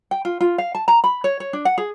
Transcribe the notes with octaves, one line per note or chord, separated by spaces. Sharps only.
G5
F4
F4
F5
A5
A#5
B5
C#5
C#5
D4
F#5
G#4